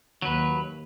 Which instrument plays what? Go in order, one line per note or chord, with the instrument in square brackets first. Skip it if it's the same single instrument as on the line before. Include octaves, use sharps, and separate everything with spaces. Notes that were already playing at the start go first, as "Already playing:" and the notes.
[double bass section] D#2 [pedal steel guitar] F#3 B4